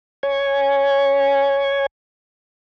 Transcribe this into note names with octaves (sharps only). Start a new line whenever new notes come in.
C#5 G#5